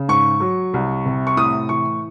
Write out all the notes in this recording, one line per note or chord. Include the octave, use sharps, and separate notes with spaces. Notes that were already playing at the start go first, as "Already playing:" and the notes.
Already playing: C#3
G#2 C#6
F#3
C2
C3
C#6
A2 D#6
E3 C#6